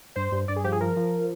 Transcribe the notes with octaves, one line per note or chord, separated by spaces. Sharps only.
G2 C5
G2
G2 D5
G#4
F3 G4
G#4
F3 A#4
F3